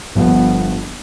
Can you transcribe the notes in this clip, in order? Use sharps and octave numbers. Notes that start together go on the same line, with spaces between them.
G1 G2 F3 B3